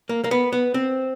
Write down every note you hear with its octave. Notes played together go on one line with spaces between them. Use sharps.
A#3
A#3
B3
B3
C4